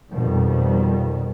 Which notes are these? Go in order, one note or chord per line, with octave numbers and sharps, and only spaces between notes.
F2 B2 D#3 G3